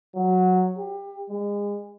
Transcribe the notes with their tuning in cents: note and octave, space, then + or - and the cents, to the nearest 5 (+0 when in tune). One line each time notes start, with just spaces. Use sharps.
F#3 -5
G4 +25
G#3 -30